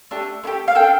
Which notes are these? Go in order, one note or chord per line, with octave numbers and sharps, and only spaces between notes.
A3 D4 G4
A3 E4 G4
F5
D4 A4 G5